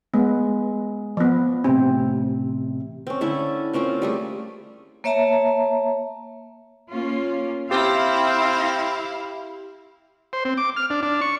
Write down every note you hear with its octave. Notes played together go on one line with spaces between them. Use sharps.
G#3 B3
F3 B3
A1 C3 C4
C4 C#4
D3 C#4 E4 A4
A#3 C4 C#4 F4
G3 A3 G#4
A#3 C#5 E5 A5 A#5
A#3 C#4 F4
C4 E4 G4 F5
C5
C4
D6
F6
D4
D4
C#6